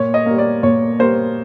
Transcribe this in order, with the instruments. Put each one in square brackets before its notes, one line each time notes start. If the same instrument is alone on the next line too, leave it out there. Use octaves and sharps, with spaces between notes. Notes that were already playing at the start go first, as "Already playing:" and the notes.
Already playing: [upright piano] A#2 C#5
D#5
G3 A#3
D5
A#2 C#5
G3 A#3 C5